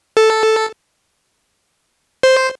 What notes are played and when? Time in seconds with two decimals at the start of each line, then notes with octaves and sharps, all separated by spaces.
0.17 A4
2.23 C5